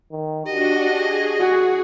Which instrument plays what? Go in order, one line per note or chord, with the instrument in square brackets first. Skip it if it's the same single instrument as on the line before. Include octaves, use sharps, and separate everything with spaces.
[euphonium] D#3
[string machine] D4 F#4 [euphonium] G4 [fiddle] D#5
[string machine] G#4
[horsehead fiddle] F#4